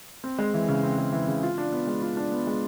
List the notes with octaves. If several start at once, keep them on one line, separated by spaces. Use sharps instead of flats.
C4
G#3
E3
C#3
C4
G#3
E3
C#3
F4
D4
B3
G#3
F4
D4
B3
G#3